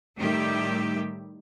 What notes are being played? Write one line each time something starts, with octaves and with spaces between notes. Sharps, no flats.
A2 D#3 G3 A3 G4 E5